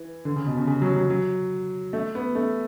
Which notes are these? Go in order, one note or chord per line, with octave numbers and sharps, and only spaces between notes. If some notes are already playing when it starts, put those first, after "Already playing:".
Already playing: E3
D3
C#3
B2
C#3
C#3
F#3
F#3
F#3
A3
B3
A3